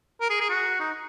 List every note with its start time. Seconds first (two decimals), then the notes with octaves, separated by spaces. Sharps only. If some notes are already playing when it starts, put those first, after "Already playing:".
0.21 A#4
0.30 G#4
0.41 G#4
0.49 F#4
0.80 D#4